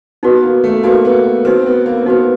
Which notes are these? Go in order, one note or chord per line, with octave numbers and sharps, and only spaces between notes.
B3 D#4 F#4 B4
A#3
A3
A#3 D#4 F#4 B4
B3
C4 D#4 F#4 B4
B3
A#3
C4
B3 D#4 F#4 B4